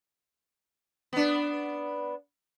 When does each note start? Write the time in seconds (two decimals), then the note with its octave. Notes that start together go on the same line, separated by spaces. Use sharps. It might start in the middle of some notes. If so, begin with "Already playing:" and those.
1.13 B3 D4